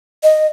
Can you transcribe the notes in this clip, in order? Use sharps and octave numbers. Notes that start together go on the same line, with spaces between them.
D#5